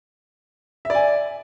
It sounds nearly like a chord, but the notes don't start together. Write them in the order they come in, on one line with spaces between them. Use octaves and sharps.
E5 D5 G#5